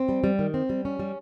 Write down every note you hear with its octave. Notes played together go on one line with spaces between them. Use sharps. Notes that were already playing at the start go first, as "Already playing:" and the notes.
Already playing: C4
G3
G3
D#3
C4
G3
C#4
G3